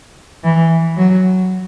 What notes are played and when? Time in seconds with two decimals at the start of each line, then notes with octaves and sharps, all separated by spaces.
0.44 E3
0.97 F#3